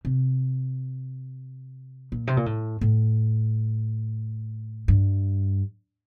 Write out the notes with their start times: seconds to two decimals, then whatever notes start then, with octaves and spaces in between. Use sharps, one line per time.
0.05 C3
2.12 A#2
2.27 C3
2.37 A#2
2.46 A2
2.81 A2
4.88 G2